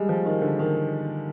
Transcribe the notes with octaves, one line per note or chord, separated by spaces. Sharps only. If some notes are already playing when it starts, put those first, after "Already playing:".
Already playing: G3 G#3
F3
D#3
D3
D#3